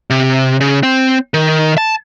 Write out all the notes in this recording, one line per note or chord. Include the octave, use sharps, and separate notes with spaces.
C3
C#3
C4
D#3
A5